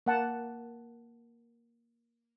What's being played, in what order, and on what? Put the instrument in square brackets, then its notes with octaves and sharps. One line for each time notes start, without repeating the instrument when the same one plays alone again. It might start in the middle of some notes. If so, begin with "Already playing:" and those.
[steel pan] A#3 F#5 A5